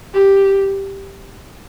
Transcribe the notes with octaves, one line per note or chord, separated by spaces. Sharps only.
G4